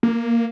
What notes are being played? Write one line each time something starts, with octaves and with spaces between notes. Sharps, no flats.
A#3